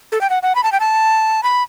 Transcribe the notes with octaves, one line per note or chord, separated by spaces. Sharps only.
A4
G5
F#5
F#5
B5
A5
G5
A5
B5